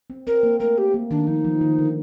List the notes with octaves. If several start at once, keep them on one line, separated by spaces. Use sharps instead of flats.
C4
C4 A#4
A#3
A3 A#4
G4
A#3
D#3 D4
F3 D#4
F3
D#3
D3